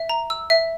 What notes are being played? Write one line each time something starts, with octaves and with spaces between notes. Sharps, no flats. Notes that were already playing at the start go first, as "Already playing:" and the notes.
Already playing: E5
A#5
E6
E5